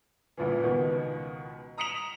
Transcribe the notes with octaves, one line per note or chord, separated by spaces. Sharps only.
A1 D2 A#2 E3
C#2 B2 D#3 B3
A#5 D#6 B6 C#7 E7 F7